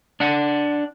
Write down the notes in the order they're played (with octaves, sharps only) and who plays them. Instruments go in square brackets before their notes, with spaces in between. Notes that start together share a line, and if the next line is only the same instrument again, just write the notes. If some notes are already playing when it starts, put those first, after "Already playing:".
[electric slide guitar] D4 F#5